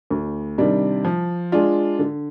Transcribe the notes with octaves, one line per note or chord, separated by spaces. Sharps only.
D2
C3 D#3 G3 D4
F3
G#3 D4 F4
D3